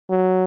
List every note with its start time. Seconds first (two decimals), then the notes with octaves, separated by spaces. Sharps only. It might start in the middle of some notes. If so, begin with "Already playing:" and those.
0.10 F#3